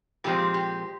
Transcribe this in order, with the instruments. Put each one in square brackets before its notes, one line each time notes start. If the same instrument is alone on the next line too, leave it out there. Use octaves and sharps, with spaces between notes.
[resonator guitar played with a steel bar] A#2 F3 G#3 C4 G4
G4